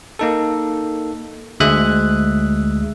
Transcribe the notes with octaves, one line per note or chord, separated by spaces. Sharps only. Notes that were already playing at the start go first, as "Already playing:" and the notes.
A#3 D#4 A4
D2 G#3 E5 D#6 F#6